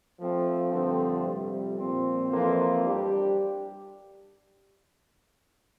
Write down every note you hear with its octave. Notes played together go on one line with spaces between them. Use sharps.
F3 A3 C4
G2 D3 F3 A3 C4
F2 C3 G3
A#2 F3 C4
F2 E3 A#3 F4 C5
G3 D4 G4